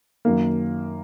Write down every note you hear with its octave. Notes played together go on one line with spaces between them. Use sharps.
F#2 D#3 A#3